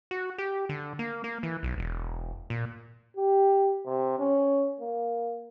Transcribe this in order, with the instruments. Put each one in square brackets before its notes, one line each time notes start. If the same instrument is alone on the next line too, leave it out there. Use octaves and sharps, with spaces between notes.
[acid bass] F#4
G4
D3
A#3
A#3
E3
B1
E1
A#2
[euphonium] G4
C3
C#4
A#3